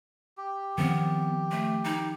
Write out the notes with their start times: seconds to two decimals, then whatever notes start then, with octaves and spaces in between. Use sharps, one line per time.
0.37 G4
0.78 D#3 F3 B3 C4
1.51 A3
1.85 D#4